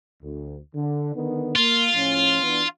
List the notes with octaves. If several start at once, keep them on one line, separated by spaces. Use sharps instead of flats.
D2
D3
D3 D#3 B3
A#3 F4
A2 F3 C#4
E3 B3 D4